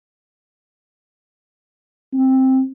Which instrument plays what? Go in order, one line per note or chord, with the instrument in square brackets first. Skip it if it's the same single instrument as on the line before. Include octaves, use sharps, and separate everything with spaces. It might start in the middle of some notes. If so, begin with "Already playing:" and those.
[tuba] C4